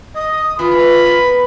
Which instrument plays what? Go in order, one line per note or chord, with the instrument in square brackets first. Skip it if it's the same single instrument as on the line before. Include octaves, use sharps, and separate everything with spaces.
[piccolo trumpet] D#5 [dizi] D#6
[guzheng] E3 [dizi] F4 [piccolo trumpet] B5
[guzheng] B3 A#4